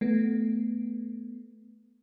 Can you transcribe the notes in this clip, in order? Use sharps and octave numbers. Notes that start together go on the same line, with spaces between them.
A3 B3